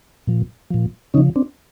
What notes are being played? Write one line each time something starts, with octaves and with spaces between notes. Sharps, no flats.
A#2 F3
A#2 F3
C#3 F3 C#4 D#4
C4 D4